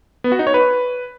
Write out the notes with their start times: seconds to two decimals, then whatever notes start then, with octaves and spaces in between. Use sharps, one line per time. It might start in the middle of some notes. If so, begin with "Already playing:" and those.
0.24 B3
0.32 F#4
0.39 D#4
0.47 C#5
0.54 B4